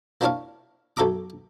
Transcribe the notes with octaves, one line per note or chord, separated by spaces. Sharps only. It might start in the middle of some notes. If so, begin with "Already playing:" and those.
A#3 C4 D4 E4 C#5 F5
B1 F#2 A4 E5 A#5 D6